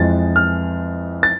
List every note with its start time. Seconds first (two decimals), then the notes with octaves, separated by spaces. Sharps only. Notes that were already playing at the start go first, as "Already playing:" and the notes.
Already playing: F2 E3 G#3 A6
0.36 F6
1.23 A6